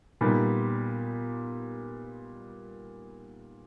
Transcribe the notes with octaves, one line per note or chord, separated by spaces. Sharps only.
A#2 G3 B3 D#4